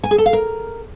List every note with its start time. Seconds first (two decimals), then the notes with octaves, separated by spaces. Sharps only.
0.04 G#5
0.11 G#4
0.18 A4
0.26 F5
0.33 A#4